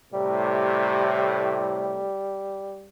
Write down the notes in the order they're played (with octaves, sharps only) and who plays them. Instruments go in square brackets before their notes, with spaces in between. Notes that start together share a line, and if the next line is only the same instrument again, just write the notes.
[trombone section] A2 C3 [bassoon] G3